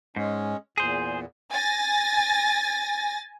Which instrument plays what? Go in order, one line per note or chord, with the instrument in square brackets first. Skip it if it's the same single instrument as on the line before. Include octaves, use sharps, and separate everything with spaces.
[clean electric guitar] G#2 [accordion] G#3 C#4
[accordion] E2 A#2 [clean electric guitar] G#4 C5
[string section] G#5 A6 A#6